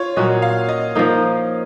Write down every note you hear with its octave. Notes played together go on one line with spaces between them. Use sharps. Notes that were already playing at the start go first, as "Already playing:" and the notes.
Already playing: F4 C#5
A#2 F#3 C#4 F#4 D#5
F5
D#5
F3 A#3 D#4